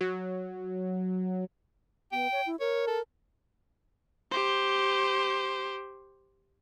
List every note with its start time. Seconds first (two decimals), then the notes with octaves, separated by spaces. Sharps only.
0.01 F#3
2.12 B3 G5
2.32 C#5
2.46 E4
2.60 A#4 C#5
2.87 A4
4.31 G4 C5